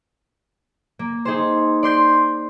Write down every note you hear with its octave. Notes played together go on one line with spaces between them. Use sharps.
A#3
D#4 G#4 C5
D5 C6 G6 C7